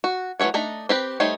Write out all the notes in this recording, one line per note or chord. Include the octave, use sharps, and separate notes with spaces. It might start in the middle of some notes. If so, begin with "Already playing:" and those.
F#4
E3 F#3 A3 C#5 F#5
A3 D4 D#4 A#5
C4 G4 B4
G3 A3 D#4 C5 C#5